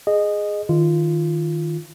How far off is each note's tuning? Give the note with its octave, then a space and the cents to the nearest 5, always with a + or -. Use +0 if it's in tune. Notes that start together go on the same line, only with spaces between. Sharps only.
G#4 +0 D#5 -15
D#3 +0 F4 -15